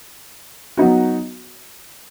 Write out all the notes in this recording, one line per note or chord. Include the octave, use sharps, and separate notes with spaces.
F#3 B3 D#4 F#4